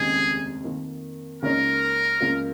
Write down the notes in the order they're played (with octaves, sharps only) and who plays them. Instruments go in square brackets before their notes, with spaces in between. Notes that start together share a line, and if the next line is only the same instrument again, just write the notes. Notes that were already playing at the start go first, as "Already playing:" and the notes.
Already playing: [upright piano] F1 D#2 C#3 G#3 D#4 [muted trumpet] G#4
[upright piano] F2 D#3 A#3
[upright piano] C#2 C#3 A#3 D#4 C#5 [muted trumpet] A#4
[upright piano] C#2 C#3 A#3 F4